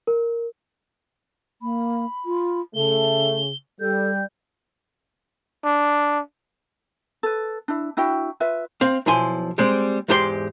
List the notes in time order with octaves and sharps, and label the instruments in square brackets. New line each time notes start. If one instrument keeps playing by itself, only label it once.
[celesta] A#4
[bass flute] A#3 [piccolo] B5
[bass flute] F4
[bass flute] C#3 [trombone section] A3 [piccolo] G7
[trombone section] G3 [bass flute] A4 [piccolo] G6
[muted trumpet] D4
[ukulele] A4 B4
D4 E4
D4 E4 F#4 G5
F4 B4 E5
[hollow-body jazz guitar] C4 F5
B1 F3 E4 G#5 C6
G3 G#3 C4
E2 G#2 G#3 G4 C5 C6